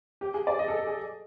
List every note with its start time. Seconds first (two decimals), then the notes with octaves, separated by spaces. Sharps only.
0.21 G4
0.34 G#4
0.47 D5
0.59 D#5
0.68 A4
0.78 A4
0.87 G#4